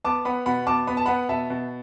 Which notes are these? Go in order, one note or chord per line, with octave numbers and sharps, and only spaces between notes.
B3 A5 D6
B3 F#5 B5
B2 F#5 B5
B2 A5 D6
B3 B5
A5
B3 F#5 B5
B2 E5 A5
B2